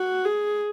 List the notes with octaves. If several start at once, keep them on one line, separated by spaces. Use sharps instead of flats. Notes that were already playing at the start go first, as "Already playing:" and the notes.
Already playing: F#4
G#4